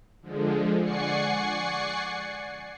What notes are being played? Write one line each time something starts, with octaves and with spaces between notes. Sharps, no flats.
D3 F3 G#3
D5 F#5 G#5 C#6 C7 C#7